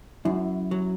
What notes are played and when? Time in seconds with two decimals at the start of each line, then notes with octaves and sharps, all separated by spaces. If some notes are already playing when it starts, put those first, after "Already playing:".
0.25 F#2 E4
0.71 F#3